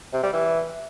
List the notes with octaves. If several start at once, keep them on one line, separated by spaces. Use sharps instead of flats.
C3
G3
E3